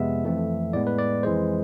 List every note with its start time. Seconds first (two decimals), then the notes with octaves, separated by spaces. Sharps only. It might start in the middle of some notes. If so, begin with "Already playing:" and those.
Already playing: F2 C3 G#3 B3 E5
0.24 F2 E3 A3 C4
0.73 A2 G#3 B3 D5
0.87 B4
0.98 D5
1.23 F2 E3 G#3 C5